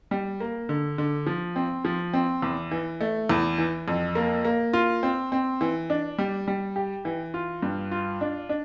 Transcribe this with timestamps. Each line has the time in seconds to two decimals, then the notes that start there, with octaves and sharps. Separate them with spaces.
0.11 G3
0.40 A#3
0.69 D3
0.98 D3
1.27 F3
1.56 C4
1.85 F3
2.13 C4
2.42 E2
2.71 E3
3.01 A3
3.29 E2
3.58 E3
3.88 F2
4.15 A#3
4.45 A#3
4.73 F4
5.03 C4
5.32 C4
5.61 E3
5.90 D4
6.18 G3
6.47 G3
6.76 G4
7.05 E3
7.34 F4
7.62 G2
7.91 F4
8.21 D4
8.49 D4